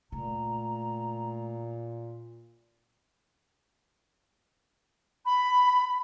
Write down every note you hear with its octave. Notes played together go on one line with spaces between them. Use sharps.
A#2 C#3 A3 A#5
B5